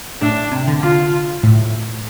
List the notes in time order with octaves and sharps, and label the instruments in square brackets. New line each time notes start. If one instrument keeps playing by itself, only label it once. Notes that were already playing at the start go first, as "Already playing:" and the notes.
[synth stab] A2 [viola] D4
[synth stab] C3
D3
[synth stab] D3 [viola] F4
[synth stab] A2